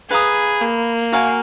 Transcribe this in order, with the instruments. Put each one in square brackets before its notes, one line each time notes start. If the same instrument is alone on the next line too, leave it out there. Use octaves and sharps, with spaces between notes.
[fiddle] G#4 [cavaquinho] B4 F5 A#5 D#6
[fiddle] A#3
[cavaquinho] F#4 A#4 F5 G#5